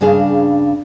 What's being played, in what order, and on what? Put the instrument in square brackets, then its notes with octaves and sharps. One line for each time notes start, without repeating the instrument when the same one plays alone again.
[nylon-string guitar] G2 C#3 D4 G#4 F5